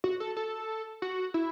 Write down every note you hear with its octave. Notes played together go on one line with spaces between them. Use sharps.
F#4
A4
A4
F#4
E4